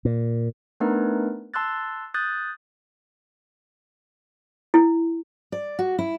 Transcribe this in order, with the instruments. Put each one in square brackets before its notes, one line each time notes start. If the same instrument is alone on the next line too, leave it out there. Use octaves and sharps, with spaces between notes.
[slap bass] A#2
[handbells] A3 B3 D4 D#4 A#4 B4
A5 C6 E6 F#6 A6
D#6 F#6 G6 A6
[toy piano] E4
[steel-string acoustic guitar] D5
F#4
E4